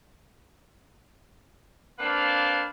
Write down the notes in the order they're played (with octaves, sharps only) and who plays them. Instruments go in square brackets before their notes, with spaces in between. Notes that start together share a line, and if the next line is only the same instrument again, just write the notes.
[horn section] A#3 C4 D4 B4 F5